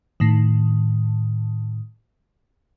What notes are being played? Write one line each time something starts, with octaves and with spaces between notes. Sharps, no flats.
A2 D#3